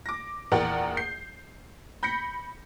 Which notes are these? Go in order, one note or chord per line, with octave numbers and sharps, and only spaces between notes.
D6 A#6
A#1 E2 A#4 D5 F#5 G5
G6 C7
B5 G6 A#6 B6 C#7